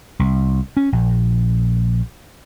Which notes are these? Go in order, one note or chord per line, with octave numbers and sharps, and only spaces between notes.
C2
C#4
A#1